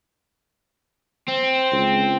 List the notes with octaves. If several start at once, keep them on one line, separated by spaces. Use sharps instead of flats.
C4
C#2